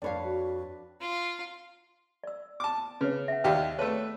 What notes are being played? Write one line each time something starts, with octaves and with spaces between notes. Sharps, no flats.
F2 D4 B4 C#5 F5
F#4
F4
D5 E6
A5 D6
C#3 B4 C#5
E5 F#5
D#2 G4 D5 F5 G5
A3 G#4 B4 C#5 A5